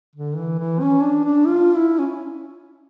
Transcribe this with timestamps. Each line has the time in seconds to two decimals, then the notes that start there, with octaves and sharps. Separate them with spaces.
0.15 D3
0.37 E3
0.59 E3
0.80 C#4
1.02 D4
1.24 D4
1.47 F4
1.75 E4
1.99 C#4